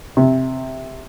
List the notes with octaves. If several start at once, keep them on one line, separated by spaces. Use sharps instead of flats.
C3